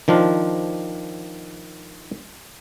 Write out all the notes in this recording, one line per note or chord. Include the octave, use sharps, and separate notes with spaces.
D#3 F3 D4 F4